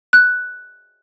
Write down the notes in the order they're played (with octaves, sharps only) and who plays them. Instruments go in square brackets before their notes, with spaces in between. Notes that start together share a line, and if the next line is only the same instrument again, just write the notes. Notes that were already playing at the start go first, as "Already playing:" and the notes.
[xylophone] F#6